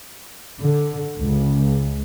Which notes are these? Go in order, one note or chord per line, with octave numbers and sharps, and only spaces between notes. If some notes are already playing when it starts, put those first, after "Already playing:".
D3
C#2